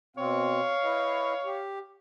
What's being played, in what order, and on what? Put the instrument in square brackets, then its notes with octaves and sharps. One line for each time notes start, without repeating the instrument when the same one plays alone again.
[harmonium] B2 C4 [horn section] C#5 F5
[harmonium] E4 B4 D#5
G4